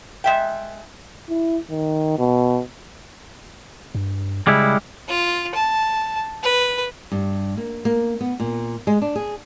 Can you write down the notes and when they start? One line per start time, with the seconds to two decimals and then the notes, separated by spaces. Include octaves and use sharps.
0.24 G#3 E5 G5
1.29 E4
1.71 D#3
2.18 B2
3.95 G2
4.47 C#3 G3 G#3 E4
5.08 F4
5.55 A5
6.43 B4
7.12 G2
7.57 A#3
7.85 A#3
8.21 B3
8.40 A#2
8.87 G#3
9.02 D4
9.16 G#4